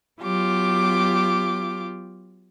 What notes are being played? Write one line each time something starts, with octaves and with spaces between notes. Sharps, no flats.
F#3 B3 F4 G4 D6